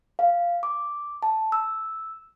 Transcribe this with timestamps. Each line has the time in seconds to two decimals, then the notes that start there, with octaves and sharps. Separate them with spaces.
0.19 F5
0.63 D6
1.23 A5
1.52 E6